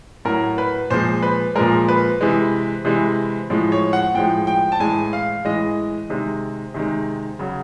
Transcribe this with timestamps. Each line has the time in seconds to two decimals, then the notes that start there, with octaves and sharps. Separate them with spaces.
0.25 A2 F#3 A#4
0.58 B4
0.90 A#2 F3 G#3 C5
1.22 B4
1.55 A#2 F3 G#3 A#4
1.88 B4
2.21 C3 E3 G#3
2.85 C3 E3 G#3
3.50 A2 F3 G#3
3.72 C#5
3.93 F#5
4.15 A2 F3 G#3 G5
4.47 G5
4.72 A5
4.80 A2 E3 G#3 G#5
5.13 F5
5.45 A2 E3 G#3 D#5
6.10 C3 D#3 G#3
6.74 C3 D#3 G#3
7.39 C#3 F#3